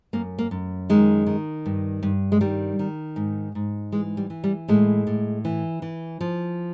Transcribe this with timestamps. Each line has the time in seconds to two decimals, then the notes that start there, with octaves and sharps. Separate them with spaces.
0.13 F#2 A#3
0.39 A#3
0.51 F#2
0.90 D#3 G#3
1.27 D#3
1.66 G2
2.03 G2
2.32 G#3
2.41 D#3 G3
2.79 D#3
3.16 G#2
3.55 G#2
3.92 E3 G#3
4.17 G3
4.30 E3
4.44 G3
4.68 A2 G#3
5.07 A2
5.45 E3
5.82 E3
6.21 F3